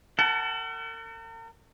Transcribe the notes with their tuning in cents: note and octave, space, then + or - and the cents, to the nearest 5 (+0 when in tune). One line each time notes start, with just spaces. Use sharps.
A#4 -45 F#5 +35 A5 -5